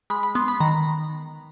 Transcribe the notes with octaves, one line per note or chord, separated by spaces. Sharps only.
G#3 B5
B5
B3 C6
B5
D#3 A#5